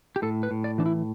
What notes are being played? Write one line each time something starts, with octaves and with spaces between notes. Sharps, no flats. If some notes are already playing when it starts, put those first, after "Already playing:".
G4
A2 A4
B4
A2
D5
E3 D4
E4